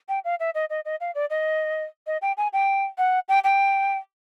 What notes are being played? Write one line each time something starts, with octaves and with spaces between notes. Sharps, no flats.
G5
F5
E5
D#5
D#5
D#5
F5
D5
D#5
D#5
G5
G#5
G5
F#5
G5
G5